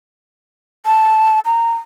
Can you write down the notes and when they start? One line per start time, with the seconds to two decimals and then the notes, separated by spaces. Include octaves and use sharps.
0.86 A5
1.46 A#5